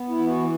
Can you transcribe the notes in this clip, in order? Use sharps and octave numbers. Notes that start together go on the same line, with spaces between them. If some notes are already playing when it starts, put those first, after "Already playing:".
Already playing: B3
E4
E3
F#4